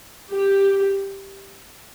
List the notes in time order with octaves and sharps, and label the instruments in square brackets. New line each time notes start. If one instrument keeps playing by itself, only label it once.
[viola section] G4